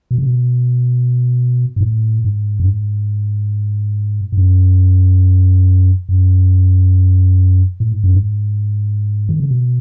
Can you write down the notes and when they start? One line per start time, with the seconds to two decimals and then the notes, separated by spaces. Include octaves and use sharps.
0.11 B2
0.18 C#3
0.26 B2
1.76 G#2
1.81 A2
2.25 G#2
2.60 F#2
2.67 G#2
4.32 G#2
4.37 F#2
6.09 F#2
7.80 A2
7.92 G#2
8.04 F#2
8.15 G#2
9.29 D#3
9.40 C#3
9.51 B2